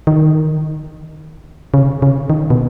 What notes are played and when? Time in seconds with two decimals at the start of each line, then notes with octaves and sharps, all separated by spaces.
0.07 D#3
1.74 C#3
2.02 C#3
2.30 D#3
2.50 B2